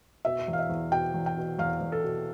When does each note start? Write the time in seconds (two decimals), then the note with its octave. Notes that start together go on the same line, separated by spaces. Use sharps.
0.25 B2 E5
0.48 E2
0.53 F5
0.59 E5
0.70 E2
0.92 B2 G5
1.14 E2
1.26 G5
1.37 B2
1.59 E2 F5
1.81 E2
1.92 A4
2.04 B2